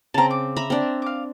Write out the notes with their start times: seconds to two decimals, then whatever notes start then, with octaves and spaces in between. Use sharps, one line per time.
0.14 C#3 C4 A5 A#5
0.30 D6
0.56 E5 A#5 B5
0.70 C4 D4
1.02 F5 D6